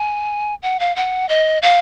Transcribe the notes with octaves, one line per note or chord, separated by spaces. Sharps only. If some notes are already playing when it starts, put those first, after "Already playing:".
Already playing: G#5
F#5
F5
F#5
D#5
F5